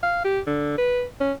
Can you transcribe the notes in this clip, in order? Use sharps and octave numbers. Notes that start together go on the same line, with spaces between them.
F5
G4
D3
B4
C#4